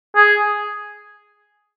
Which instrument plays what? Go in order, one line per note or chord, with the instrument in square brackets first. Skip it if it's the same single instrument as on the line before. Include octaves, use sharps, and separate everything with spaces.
[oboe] G#4